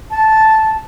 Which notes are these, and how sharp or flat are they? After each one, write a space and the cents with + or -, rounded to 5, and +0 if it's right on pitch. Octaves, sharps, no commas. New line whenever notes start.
A5 -10